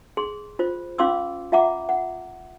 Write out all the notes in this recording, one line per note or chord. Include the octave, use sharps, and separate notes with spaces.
G#4 C6
F4 C5
C#4 F4 F5 C6 D6 E6
F4 E5 F#5 A#5 D6
F#5